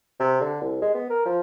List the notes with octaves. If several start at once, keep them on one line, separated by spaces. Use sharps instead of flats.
C3
D3
C2
G#3
B3
A#4
F3